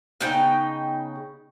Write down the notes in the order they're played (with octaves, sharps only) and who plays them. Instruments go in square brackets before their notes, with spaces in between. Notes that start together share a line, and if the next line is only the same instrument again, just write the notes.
[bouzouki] C#3 B3 D#4 G5